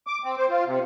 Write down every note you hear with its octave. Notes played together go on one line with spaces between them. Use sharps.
D6
C4
C5
F4
C3